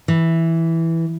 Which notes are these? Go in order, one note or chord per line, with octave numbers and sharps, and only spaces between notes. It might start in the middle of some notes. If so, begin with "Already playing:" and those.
E3